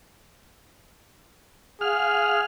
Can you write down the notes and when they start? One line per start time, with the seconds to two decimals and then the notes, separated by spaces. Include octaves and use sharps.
1.81 G#4 F5 F#5 F6